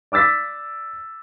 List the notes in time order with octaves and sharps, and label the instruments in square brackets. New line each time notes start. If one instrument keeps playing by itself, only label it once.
[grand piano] D5 D6 E6 A6 B6